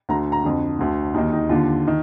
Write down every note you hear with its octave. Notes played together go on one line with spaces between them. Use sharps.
D2 D3 A#5
A#5
F2 D3
D2 D3
D#2 D#3 D#4
D#4
D#2 D3 F4
D#3